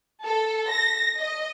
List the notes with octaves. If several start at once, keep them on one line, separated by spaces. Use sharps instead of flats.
A4
A#6
D#5